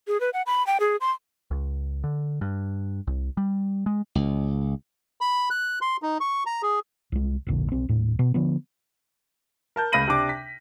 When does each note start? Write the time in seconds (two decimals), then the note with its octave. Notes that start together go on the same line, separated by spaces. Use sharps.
0.07 G#4
0.20 B4
0.34 F#5
0.46 B5
0.67 G5
0.80 G#4
1.01 C6
1.51 C#2
2.04 D3
2.41 G2
3.07 C2
3.37 G3
3.86 G#3
4.15 C#2
5.21 B5
5.50 F#6
5.81 C6
6.02 D#4
6.20 C#6
6.46 A#5
6.62 G#4
7.12 C2 G#3
7.47 E1 A#1 D3
7.72 B1 C4
7.89 D#1 A2
8.19 B2
8.34 D3 F3 B3
9.76 A#4 A5 G6
9.92 C#2 C#3 B5 A#6 D#7 F#7
10.07 C3 D4 D6
10.29 B6